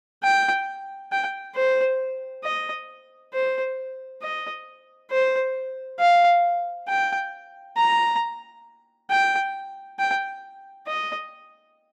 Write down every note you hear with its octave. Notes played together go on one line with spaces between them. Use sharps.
G5
G5
C5
D#5
C5
D#5
C5
F5
G5
A#5
G5
G5
D#5